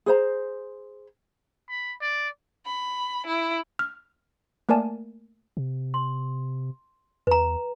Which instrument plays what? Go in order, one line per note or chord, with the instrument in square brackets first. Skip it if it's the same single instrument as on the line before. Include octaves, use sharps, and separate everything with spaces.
[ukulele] G#4 C5 A#5
[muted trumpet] B5
D5
[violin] B5
E4
[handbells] F6
A3 A#3 A#4 D5 G#5 A5
[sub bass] C3
[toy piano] C6
[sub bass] E2 [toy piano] B4 A#5